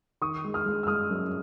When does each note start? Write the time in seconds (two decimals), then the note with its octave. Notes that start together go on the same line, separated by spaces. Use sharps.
0.21 D#3 C#6 D#6
0.44 G#3
0.54 D#6 F6
0.66 G#3
0.83 E6
0.87 G#3 D#6 F6
1.10 F#2